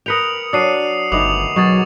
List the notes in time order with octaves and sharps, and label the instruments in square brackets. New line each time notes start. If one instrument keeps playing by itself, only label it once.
[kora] A#4 B4 G5 [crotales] D#6 C#7 F7
[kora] F#3 D4 [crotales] D#6 C7 D#7
[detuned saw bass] G1 [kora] D#3 A3 B3 [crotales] D6 D#6 F7
[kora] B2 G#4 [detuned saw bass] F#3 [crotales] C#6 A6